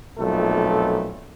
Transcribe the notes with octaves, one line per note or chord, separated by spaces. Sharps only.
B1 F2 A#2 A3 A4